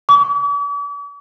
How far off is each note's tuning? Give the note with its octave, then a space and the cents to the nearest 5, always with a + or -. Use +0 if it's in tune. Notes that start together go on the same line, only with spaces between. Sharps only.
D6 -45